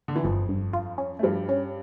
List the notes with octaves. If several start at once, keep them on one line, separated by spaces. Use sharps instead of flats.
D3
E3
G1 F2 F3
G2
F4
C#4
A3
G2 F3 G3
C#4